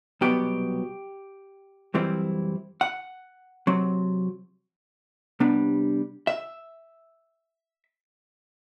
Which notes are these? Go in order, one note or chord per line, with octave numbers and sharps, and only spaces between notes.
C2 B2 F#3 B3 G4
F#2 E3 G3 C4 E4
F#5
C3 F#3 C4
C3 G3 B3 D4
E5